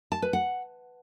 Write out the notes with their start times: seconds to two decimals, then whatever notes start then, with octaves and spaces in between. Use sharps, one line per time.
0.12 A5
0.22 B4
0.33 F#5